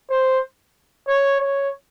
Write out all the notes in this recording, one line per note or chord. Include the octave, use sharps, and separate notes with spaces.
C5
C#5
C#5